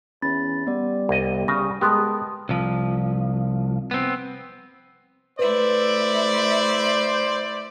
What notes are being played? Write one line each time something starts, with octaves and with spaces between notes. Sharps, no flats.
E2 C#4 B5 A6
G3 B3 D5
C2 D#5
C#3 A#6
G#3 B3 G4 A#4 G5 A5 C6 D#6
C2 F3
B3 C4
A3 E4 B4 C5 D5 E5